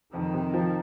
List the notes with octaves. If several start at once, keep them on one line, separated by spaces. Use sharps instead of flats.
F2 D#3
C3
F3